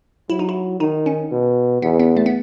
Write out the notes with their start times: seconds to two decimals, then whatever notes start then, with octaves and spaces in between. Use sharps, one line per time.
0.30 F#3 E4
0.39 D#4
0.49 E4
0.80 D#3 D#4
1.06 C#4
1.31 B2
1.82 E2 B3
2.00 B3
2.17 A3
2.26 B3